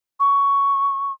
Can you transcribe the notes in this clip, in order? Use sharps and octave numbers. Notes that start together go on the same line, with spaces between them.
C#6